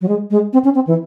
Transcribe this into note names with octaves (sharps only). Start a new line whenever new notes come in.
F#3
G#3
G#3
C4
C#4
C4
E3